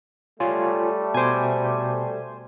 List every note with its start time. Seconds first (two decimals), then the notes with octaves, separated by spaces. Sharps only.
0.40 G3 A3 F4 C#5 G#5
1.14 B2 C5 G#5 D6